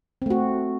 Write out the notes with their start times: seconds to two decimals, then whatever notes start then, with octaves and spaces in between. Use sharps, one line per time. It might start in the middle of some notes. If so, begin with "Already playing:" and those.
0.22 C4
0.26 A3
0.30 F#4